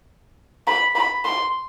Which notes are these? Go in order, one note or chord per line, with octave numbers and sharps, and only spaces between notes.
B5
B5
C6